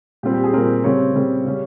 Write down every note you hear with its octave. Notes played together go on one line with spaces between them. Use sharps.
A#2 G3 C4 G4
G4
G#4
A#2 G3 C4 A#4
C#3 G3 C4 C#5
C#3 G3 C4
C#3 G3 C#4